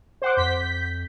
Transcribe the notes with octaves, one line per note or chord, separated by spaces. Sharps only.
C5 F#5 D6
F2 G6 B6